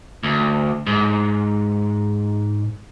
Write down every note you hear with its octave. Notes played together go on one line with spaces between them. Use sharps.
D2
G#2